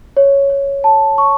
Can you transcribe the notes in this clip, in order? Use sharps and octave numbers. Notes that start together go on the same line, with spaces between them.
C#5
C#5
A5
C#6